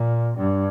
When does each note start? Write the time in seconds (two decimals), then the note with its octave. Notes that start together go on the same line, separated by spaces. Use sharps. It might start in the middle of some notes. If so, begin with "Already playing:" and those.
Already playing: A#2
0.37 G2